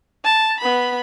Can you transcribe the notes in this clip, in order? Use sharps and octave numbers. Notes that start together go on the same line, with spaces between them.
A5
B3 B5